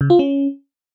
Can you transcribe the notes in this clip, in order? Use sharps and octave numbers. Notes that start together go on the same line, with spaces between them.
C#3
F4
C#4